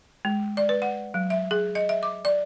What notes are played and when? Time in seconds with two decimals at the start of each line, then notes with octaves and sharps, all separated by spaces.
0.25 G#3
0.57 D5
0.69 B4
0.82 F#5
1.14 F#3
1.30 E5
1.51 G#4
1.75 D#5
1.89 E5
2.03 D6
2.25 D5